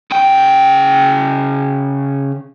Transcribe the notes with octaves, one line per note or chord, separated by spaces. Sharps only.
C#3 G5